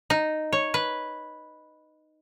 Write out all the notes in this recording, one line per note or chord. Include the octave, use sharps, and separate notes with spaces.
D#4
C#5
B4